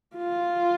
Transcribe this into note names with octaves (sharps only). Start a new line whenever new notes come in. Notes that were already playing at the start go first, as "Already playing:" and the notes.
F4